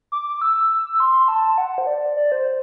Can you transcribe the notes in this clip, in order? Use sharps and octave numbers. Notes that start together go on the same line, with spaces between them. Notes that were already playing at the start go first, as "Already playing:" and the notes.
D6
E6
C6
A5
F#5
C5
D5
D5
C5